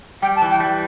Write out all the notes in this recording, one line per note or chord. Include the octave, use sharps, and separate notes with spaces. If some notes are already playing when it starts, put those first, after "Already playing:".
G3 G5
A5
E3
G5
G3